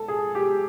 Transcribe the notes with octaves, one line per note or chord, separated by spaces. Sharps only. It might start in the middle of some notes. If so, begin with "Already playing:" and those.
Already playing: A4
G#4
G4